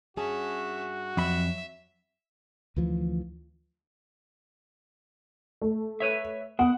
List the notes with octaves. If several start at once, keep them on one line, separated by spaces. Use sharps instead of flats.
G2 C#4 F#4 G#4 E5 A5
F2 F#3 E5 B5
D2 E3 F3
A3
B4 C#5 E5
B3 F#5